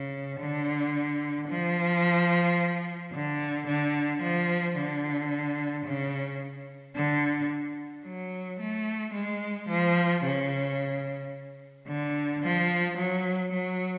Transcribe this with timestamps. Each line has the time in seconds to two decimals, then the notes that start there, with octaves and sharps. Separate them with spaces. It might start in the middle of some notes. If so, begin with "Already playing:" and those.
Already playing: C#3
0.40 D3
1.49 F3
3.13 D3
3.67 D3
4.22 F3
4.77 D3
5.86 C#3
6.95 D3
8.05 F#3
8.60 A3
9.14 G#3
9.69 F3
10.24 C#3
11.87 D3
12.42 F3
12.97 F#3
13.52 F#3